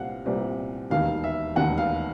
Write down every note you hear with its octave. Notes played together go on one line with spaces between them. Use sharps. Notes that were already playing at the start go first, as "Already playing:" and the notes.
Already playing: C2 A#2 G3 C4 F5 F#5
C2 A#2 G3 C4
E1 D#2 D#3 F5
E5
E1 D#2 D#3 F#5
F5